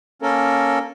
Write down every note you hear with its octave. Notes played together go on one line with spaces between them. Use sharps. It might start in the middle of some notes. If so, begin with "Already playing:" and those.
A#3 C#4 A4 A#4